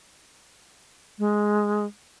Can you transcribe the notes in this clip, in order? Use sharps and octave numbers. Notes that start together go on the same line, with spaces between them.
G#3